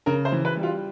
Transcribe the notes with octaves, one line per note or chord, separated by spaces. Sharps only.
C#3 A#4
C5
E3
B4
G3
F4